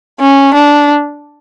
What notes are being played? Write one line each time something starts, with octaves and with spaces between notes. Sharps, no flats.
C#4
D4